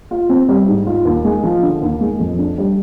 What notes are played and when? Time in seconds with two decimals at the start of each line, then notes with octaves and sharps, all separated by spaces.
0.11 F4
0.29 C4
0.49 G3
0.68 G#2
0.87 F4
1.05 D#2
1.25 G#3
1.44 F3
1.63 D3
1.82 D#2
2.01 G#3
2.19 F2
2.39 D4
2.58 G3